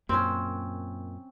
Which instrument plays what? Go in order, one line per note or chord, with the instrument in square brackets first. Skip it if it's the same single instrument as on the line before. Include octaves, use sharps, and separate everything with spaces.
[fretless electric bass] F#2 A#2 [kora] C4 C#4